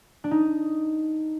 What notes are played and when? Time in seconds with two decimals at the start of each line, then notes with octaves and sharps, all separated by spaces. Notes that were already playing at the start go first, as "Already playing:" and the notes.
0.24 D4
0.31 D#4